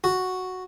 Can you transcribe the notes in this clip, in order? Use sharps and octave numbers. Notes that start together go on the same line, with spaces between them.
F#4